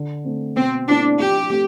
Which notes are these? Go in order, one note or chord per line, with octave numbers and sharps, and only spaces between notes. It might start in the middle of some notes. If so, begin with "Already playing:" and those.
Already playing: D3
A3 C4
B2 C4
A3 C4 D4 E4
F3 G4
A3 C4